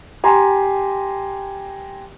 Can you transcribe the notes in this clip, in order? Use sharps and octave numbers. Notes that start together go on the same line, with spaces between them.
G4 G#5 A#5 C6